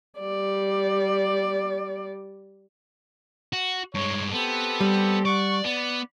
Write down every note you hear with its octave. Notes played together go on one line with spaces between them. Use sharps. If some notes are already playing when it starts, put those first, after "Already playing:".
G3 D5
F#4
G2 G#3 C#5
B3 C4 G4 A4
G3
D5 F#5 C#6
B3 D5